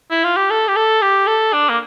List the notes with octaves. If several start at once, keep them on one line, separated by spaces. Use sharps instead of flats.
E4
F4
G4
A4
G4
A4
G4
A4
D4
A#3